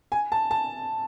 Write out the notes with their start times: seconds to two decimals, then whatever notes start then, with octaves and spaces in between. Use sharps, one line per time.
0.12 G#5
0.32 A5
0.51 A5